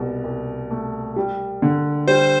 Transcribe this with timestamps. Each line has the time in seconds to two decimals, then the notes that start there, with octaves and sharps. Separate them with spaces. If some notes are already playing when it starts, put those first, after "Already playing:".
Already playing: C2 B2
0.24 C2
0.71 A3
1.16 G3
1.62 D3
2.07 G3 C5